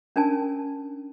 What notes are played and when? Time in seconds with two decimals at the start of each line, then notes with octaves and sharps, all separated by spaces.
0.16 C#4 D4 A#4 G#5 A5